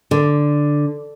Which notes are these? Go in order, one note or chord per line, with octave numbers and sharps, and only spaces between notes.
D3